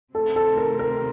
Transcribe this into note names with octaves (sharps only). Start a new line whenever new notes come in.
C3 D#3 A3 C4 A4
A4
A#4
A#4